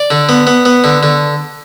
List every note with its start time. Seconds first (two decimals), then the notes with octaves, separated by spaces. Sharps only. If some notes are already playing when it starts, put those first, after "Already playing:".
Already playing: D5
0.11 D3
0.29 B3
0.47 B3
0.65 B3
0.84 D3
1.03 D3